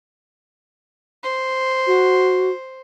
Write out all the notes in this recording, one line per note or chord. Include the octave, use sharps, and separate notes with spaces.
C5
F#4